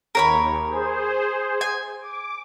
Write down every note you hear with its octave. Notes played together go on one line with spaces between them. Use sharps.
D#2 A#4 C#5 B5
G#4 C5
G#5
D6